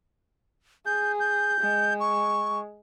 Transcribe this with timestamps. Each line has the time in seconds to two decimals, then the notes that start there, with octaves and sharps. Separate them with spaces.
0.86 G#4 G6
1.20 G6
1.60 G#3
2.00 C#6